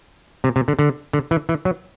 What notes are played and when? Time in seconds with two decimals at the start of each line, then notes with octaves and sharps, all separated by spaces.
0.44 C3
0.56 C3
0.68 D3
0.79 D3
1.13 D3
1.31 E3
1.49 E3
1.65 F#3